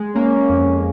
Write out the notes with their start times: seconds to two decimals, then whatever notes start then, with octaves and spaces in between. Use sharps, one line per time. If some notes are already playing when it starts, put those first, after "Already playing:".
Already playing: G#3
0.15 A#3 C#4
0.49 F2